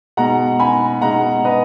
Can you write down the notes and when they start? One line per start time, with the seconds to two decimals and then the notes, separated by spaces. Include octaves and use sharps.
0.17 B2 G#3 D#4 F#5 A#5
0.59 G#5 B5
1.01 B2 G#3 D#4 F#5 A#5
1.45 B4 D#5